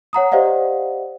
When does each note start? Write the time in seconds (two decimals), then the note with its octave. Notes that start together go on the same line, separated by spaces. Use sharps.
0.13 C#5 F#5 A#5 D#6
0.32 G4 C5 D5 D#5 F5 F#5